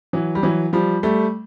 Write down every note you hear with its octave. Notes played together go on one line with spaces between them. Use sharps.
E3 F#3
G3
E3 F#3
F3 G3
G3 A3